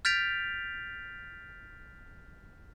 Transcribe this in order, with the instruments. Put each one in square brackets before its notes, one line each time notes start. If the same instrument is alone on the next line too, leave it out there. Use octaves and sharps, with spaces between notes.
[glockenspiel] F6 G6 A6 B6 D7 F7